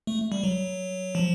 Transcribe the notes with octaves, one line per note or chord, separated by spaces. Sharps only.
A3
G3
F#3
F3